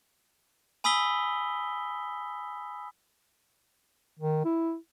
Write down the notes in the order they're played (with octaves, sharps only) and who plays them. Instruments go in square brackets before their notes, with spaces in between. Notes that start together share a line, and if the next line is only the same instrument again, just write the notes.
[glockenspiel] G#5 B5 D#6 E6 B6 G7
[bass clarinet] D#3
E4